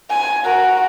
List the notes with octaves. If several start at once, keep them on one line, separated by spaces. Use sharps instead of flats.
G#5
F#4 A#4